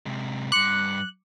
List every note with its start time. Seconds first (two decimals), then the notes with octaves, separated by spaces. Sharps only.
0.06 C3 G#3
0.52 G2 C6 D6 F#6 C#7